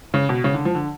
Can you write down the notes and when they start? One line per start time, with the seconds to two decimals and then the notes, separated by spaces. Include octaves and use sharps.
0.14 C#3
0.29 B2
0.44 C#3
0.54 D3
0.65 F3
0.75 D3